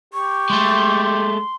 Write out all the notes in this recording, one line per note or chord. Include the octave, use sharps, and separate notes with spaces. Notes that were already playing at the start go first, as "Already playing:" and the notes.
G4 C#6
G#3 A3 C6
C6